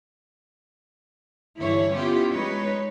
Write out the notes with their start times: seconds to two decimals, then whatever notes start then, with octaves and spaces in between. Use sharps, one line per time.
1.59 G2 D3 E3 E4 C#5
1.93 B3 C#4 E4 F4 G4
2.32 G#3 D#4 B4 C#5